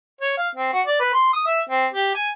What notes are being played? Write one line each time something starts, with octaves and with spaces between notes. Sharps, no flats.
C#5
F5
C4
F#4
D5
B4
C6
D#6
E5
C4
G4
G#5